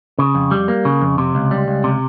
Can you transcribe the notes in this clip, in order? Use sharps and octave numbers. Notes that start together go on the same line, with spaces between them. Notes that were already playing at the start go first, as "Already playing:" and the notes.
C#3
F2
G3
A#3
C#3
F2
C3
C#2
G3
C#2
C3